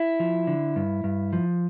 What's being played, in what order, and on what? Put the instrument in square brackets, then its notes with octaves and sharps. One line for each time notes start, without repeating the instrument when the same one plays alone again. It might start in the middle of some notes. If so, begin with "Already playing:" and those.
Already playing: [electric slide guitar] E4
F3
D3
G2
G2
F3